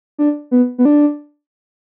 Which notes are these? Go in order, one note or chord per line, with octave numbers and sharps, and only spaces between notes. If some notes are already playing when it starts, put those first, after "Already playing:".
D4
B3
B3
D4